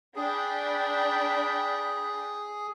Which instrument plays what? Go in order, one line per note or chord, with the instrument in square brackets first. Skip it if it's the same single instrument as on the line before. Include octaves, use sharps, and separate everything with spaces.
[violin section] D4 G5 B5 [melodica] G#4